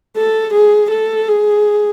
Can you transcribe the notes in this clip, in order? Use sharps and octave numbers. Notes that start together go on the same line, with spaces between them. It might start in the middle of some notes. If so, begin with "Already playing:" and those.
A4
G#4
A4
G#4